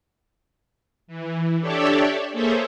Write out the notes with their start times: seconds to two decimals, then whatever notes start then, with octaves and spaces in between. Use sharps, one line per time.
1.07 E3
1.60 D4 G4 A4 C#5 D5 E5
2.33 A#3 G#4 A4 C5 C#5 E5